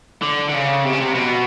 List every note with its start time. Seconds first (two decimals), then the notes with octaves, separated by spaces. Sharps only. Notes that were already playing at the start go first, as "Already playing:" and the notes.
0.23 D3
0.49 D3
0.54 C#3
0.85 C3
0.93 C#3
1.01 C3
1.15 B2